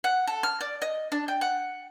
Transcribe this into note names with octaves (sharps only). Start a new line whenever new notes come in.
F#5
A4
F6
D5
D#5
D4
G5
F#5